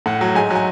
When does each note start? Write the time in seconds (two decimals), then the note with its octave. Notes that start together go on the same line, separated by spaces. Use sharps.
0.06 A2 F#5
0.21 F#3
0.35 G#2 G#5
0.50 F#3
0.55 G#5